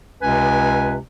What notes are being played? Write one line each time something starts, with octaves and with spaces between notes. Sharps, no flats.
C#2 C3 C#4 B4 G#5